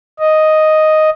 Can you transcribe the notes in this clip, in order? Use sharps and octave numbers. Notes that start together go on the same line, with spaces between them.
D#5